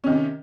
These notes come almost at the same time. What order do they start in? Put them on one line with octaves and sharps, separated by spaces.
C#4 D#3 C3